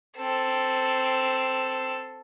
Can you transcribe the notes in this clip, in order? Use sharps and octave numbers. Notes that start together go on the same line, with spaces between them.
C4 A4